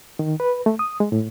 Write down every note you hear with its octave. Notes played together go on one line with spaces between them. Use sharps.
D#3
B4
A3
D#6
G#3
A2